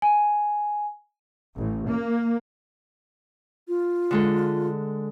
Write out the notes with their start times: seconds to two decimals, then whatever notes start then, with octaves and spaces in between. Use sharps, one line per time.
0.02 G#5
1.56 A1
1.88 A#3
3.68 F4
4.11 D3 G#3 A4